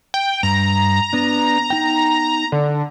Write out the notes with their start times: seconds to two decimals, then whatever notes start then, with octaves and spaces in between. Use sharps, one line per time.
0.14 G5
0.43 G2 A#5
1.13 B3 D4
1.70 B3 D#4 G5
2.52 D3